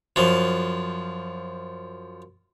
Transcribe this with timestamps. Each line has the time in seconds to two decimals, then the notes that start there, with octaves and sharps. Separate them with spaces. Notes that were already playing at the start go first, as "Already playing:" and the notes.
0.16 F#2 F3